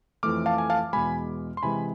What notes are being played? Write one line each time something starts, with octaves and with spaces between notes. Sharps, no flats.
F2 E3 A3 D6 F6
F5 A5
G#5
F5 A5
E2 B2 G#3 G#5 B5
C6
C3 E3 G#3 G#5 B5